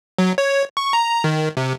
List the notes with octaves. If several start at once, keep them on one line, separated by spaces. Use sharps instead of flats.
F#3
C#5
C#6
A#5
D#3
C3